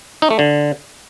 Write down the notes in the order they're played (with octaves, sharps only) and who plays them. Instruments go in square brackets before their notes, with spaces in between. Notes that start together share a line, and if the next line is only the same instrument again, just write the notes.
[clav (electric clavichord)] D#4
A3
D3